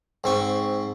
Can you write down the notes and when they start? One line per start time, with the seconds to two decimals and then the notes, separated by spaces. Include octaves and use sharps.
0.24 G#2 C4 C#6